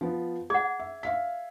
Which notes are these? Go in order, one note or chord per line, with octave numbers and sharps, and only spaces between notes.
F3 B3
G#4 F#5 G#6
E5
E5 F5 B6